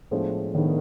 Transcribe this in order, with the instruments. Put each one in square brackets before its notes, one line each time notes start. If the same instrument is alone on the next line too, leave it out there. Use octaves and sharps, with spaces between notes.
[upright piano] A2 F3 G#3 B3 D4
[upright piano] A2 F3 G#3 B3 D4 [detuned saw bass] D#3